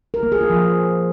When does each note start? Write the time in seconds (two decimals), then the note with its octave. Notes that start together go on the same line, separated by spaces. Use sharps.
0.14 A#4
0.23 A#3
0.32 G#4
0.41 F4
0.50 F3